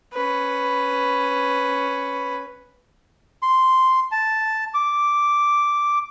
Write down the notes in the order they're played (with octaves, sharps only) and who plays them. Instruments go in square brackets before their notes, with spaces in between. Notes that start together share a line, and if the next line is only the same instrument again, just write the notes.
[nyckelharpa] C#4 B4
[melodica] C6
A5
D6